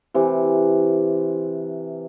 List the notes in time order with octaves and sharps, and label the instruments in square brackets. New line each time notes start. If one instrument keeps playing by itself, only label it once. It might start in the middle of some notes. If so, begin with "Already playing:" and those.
[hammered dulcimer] C3 E3